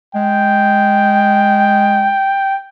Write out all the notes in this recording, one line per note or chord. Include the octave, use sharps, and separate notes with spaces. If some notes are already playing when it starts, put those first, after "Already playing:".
G#3 G5